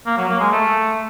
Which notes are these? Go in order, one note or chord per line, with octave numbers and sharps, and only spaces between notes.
A#3
F#3
A#3
G#3
A3